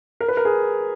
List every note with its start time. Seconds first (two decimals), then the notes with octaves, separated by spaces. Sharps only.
0.20 A#4
0.28 B4
0.37 A#4
0.45 G#4